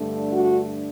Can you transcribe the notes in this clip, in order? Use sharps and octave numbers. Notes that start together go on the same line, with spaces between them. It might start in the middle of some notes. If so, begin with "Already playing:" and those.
Already playing: G2 D3 A3 D4
F#4